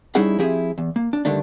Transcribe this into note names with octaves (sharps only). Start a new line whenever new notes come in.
G3 C#4 D#4 E4 G#4 F#5
F3 C4 E4 G4 G#4 E5
E2
A#3
D4
G2 D3 D#3 A3 D4